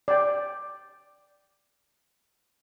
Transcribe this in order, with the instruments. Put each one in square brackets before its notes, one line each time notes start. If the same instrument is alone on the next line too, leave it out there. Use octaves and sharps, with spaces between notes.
[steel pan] D5 G5